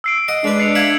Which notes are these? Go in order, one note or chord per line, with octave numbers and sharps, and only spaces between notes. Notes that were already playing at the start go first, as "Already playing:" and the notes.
E6 C7 D7
D#5 F#5
G#3 D4 B4
C7 C#7 F7
E5 F5 G#6 F#7